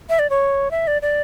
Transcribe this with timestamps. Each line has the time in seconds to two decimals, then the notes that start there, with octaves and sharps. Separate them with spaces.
0.09 E5
0.19 D5
0.30 C#5
0.71 E5
0.87 D5
1.02 D5